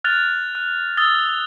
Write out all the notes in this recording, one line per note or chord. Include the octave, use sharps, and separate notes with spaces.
F6 F#6 A6 F7
F#6
D#6 E6 A6 G7